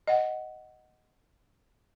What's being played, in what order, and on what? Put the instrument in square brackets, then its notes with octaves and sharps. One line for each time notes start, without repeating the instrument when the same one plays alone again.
[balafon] D#5 F#5